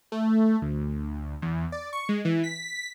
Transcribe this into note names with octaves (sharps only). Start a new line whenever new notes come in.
A3
D2
E2
D5
C#6
G#3
E3
B6